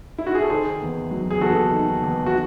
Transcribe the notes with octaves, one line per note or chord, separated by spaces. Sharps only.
E4
F#4
G#4
A4
D#3 G#4 C5
E2
F#3
G#4
E2 F#4 A4
D#3
E2
F#4